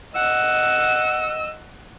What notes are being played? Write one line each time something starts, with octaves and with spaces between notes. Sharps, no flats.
D#5 F#5 E6